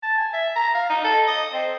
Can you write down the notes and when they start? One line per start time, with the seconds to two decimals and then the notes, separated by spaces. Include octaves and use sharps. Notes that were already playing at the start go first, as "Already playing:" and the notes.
0.03 A5
0.18 G#5
0.33 E5
0.56 A#5
0.75 F5
0.89 D#4
1.04 A4
1.27 D#5
1.53 C4